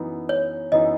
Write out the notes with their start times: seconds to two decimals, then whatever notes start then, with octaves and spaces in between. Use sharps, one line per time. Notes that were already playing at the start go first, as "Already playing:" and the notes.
Already playing: F#2 E3 B3 D#4
0.29 C#5
0.72 F#2 E3 B3 D#4 D#5